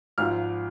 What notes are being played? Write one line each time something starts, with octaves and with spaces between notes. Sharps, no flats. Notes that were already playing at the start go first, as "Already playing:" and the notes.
G#1 G#2 F3 F6